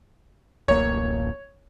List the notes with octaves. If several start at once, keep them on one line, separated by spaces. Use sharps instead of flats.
D1 A1 A#3 C#5